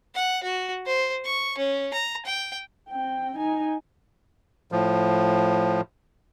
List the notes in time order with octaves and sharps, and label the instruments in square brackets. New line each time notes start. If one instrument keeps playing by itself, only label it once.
[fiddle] F#5
F#4
C5
C#6
C#4
A#5
G5
[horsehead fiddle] C4 G5
D#4 G#5
[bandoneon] A2 F3